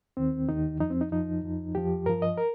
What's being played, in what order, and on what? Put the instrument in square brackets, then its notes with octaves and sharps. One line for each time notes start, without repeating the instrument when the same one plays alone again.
[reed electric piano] D#2 D#3 C4
D#2 D#3 D#4
F2 F3 D#4
C4
D#4
F2 F3 D#4
F2 F3
F2 F3 G4
G2 F3 A#4
D#5
A#4